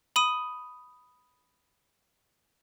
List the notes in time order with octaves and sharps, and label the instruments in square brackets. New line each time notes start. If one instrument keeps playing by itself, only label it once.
[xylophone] B5 D#6 D#7